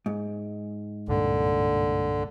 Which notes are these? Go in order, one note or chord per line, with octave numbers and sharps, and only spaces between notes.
G#2
C2 G2 A#2 D3